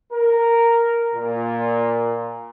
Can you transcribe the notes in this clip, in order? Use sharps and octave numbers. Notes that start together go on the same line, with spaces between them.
A#4
A#2